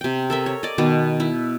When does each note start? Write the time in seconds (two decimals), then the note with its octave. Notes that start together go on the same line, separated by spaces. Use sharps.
0.01 C3 G5
0.30 A4 A#4 E5
0.46 C#5
0.63 D5 D#5
0.78 B2 D#3 B3
1.20 E4